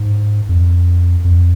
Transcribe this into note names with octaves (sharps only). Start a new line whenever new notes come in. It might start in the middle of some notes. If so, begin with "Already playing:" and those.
Already playing: G#2
F2
F2